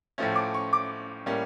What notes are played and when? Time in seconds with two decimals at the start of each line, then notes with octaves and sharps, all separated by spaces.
0.18 A2 F3 A3 C#4
0.36 D6
0.54 C#6
0.73 D6
1.26 A2 G3 A#3 C#4